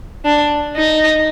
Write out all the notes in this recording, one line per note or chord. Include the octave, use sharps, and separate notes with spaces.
D4
D#4